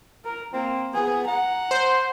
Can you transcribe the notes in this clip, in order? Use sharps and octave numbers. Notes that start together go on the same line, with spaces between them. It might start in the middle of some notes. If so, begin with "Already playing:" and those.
A#4
A#3 C4
B3 G#4
F#5 A#5
C5